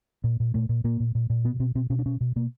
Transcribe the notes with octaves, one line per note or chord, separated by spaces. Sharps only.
A#2
A#2
A#2 A3
A#2
A#2 A#3
A#2
A#2
A#2
B2 B3
B2 C4
B2 C4
B2 C#4
D4
B2 C#4
B2
B2 A#3